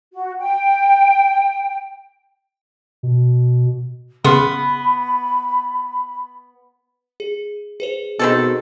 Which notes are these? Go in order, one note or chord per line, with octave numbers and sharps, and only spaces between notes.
F#4
G5
B2
C#3 B3 B5 C6 F6
G#4
G#4 B4 C5
B2 D#3 C4 G#4 A4